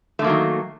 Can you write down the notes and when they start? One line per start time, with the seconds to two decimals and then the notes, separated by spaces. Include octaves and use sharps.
0.19 A3
0.22 D3
0.24 A#3
0.27 F#3
0.29 D#3